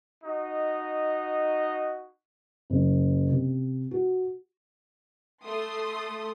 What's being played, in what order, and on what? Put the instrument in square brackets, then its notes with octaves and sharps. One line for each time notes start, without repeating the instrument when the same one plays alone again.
[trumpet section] D#4 F#4 D#5
[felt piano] F#1
C3
F#4
[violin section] A3 C6 D#6